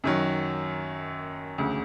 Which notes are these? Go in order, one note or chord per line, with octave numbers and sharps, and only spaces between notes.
F#2 D#3 F#3
E1 D2 C#3